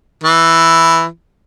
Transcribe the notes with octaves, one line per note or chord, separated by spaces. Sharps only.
E3